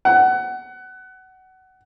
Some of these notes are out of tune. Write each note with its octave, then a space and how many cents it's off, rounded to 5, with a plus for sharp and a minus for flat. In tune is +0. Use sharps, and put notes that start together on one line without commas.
F#5 +20